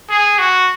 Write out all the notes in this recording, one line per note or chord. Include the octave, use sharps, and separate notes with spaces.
G#4
F#4